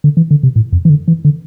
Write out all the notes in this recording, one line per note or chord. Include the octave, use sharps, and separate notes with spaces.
D3
E3
D3
C3
A2
F2
E3
D3
E3
D3